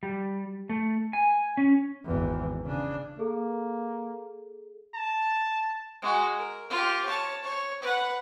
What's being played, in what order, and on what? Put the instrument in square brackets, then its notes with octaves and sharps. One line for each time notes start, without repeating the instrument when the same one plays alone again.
[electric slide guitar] G3
A3
G#5
C#4
[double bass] G#1 E2
C#3 D4
[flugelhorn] A#3 [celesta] G#4 A4
[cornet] A5
[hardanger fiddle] G#3 F#4
A#4
F4 G4
C#5 A5
C#5
B4 F#5